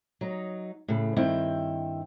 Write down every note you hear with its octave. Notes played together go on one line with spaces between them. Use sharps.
F#3 D#4
A2 C#3
G2 D#3 C4 E4 G5